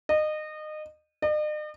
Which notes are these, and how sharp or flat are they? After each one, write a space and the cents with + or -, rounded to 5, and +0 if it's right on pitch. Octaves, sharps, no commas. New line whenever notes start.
D#5 -25
D#5 -45